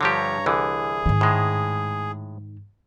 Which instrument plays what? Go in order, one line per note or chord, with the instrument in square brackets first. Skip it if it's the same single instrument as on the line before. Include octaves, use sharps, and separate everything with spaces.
[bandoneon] G2 C#5 A#5 [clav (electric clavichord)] D3 F3 G4
[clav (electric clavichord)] C2 D3 E3 [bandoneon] G#4
[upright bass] G#2 D#3
[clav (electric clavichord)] A2 G#3